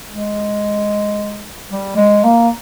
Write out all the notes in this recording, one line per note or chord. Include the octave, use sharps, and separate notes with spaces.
G#3
G3
G#3
A#3